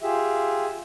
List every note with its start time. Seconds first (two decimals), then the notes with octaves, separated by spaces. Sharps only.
0.01 F4 G4 G#4 E5